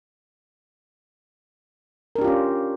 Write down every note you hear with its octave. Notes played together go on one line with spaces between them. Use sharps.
C#4 D4 F4 G4 A#4